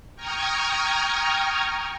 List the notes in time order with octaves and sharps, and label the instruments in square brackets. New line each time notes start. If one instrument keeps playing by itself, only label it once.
[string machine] G5 A#5 C#6 D#6 F6 G#6